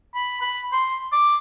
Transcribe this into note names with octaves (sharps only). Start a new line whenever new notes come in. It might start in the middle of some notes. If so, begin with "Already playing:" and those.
B5
B5
C6
D6